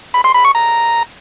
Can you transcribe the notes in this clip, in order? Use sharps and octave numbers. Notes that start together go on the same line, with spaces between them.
B5
C6
B5
C#6
A#5